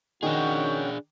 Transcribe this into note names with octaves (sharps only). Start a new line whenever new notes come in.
D#3 C#4 D4 F#4 G#4 F#5 G5